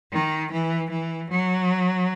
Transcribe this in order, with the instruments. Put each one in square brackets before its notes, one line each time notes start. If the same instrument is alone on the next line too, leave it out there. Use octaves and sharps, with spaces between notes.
[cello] D#3
E3
E3
F#3